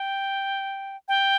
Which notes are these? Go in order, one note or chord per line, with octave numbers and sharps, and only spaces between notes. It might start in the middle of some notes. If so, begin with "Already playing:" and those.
Already playing: G5
G5